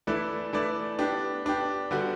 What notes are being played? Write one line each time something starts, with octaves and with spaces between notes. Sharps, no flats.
E3 A3 E4 B4 D5
E3 A3 E4 B4 D5
B3 D4 G4
B3 D4 G4
D3 G3 B3 F#4